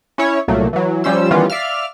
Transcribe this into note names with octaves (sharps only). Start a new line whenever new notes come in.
C#4 E4 C#5
C2 A#2 F#3 A3 A#3
E3 F#3
F3 G3 C#4 C5 E6
D#3 E3 G3 B3 C#4 F4
D5 E5 F5 F6